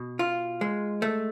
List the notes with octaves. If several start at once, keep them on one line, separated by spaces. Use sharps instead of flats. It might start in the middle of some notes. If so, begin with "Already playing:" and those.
Already playing: B2
F4
G#3
A3